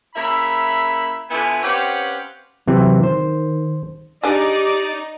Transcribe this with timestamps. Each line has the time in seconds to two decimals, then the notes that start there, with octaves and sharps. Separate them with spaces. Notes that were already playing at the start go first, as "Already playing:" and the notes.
0.15 C#3 A#3 E4 E5 B5
1.30 D3 B3 E4 F4 G#5
1.62 C4 C#4 G4 B4 F5 F#5
2.68 C3 E3 F#3 C4
3.03 D#3 C5
4.23 D4 D#4 G4 G#4 D5